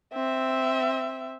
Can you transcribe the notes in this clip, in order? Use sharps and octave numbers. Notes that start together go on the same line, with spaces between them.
C4 E5